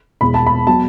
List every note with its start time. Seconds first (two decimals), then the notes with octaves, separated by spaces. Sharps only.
0.21 E1 E2 B2 B5
0.34 A5
0.47 B5
0.67 B2 F#3 A5